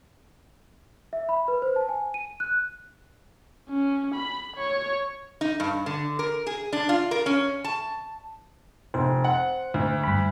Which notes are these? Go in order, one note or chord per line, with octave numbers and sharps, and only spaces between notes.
E5
B5
B4
C5
A5
G#5
D#7
F#6
C#4
B5
C#5
D#4
G2
D3
A#4
G#4
D4
F4
A#4
C#4
A5
F1 C5
F#5
D2
G2 B5